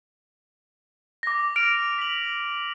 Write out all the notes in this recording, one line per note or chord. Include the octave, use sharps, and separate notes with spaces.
D6 A#6
F6 D7 F7
B6 F#7